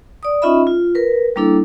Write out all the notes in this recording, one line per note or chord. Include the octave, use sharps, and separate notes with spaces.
D5 D#6
C#4 D#4 F4 D#5 E5 B5
F4
A#4 B4
G3 A#3 D4 E4 A4